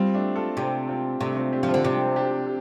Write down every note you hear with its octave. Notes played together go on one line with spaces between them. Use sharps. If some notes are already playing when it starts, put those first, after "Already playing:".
Already playing: G3 C4 F4
A3 D4
F4 A4
C3 D4 G4
C4 F4
C3 A3 D4
C4 F4
D4 G4
F3
F4 A4
D3
C3 D4 G4
D4 G4